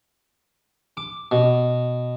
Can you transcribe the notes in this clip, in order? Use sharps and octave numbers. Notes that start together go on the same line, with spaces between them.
D6
B2